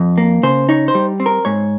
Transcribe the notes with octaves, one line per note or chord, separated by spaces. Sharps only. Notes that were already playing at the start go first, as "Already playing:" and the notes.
Already playing: F2
A#3
C#3 C5
D#4 C#5
C5
G3
C4
A#4
G#2 C#5